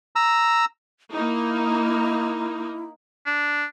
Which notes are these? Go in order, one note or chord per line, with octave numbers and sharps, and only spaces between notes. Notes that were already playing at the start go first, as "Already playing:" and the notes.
A#5 E6
A#3 D#4 E4
D4